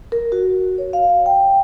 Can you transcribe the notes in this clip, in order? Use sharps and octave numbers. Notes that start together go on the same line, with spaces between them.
A#4
F#4
C#5
F5
G5